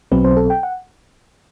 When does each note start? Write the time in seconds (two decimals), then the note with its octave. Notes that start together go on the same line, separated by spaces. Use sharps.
0.11 B1 B2 F#3 C4 B4
0.24 C5
0.37 A4
0.50 G5
0.63 F#5